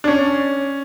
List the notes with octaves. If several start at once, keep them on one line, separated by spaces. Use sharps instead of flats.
D4
C#4